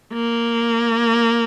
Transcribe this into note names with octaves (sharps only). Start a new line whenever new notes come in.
A#3